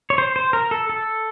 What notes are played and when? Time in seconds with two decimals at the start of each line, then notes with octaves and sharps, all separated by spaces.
0.10 C#5
0.18 C5
0.36 C5
0.53 A#4
0.71 A4
0.90 A4